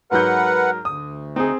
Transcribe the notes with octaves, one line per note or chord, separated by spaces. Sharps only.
G#2 F#3 A#4 B4 F#5 G6
D2 D#6
C4 D#4 G#4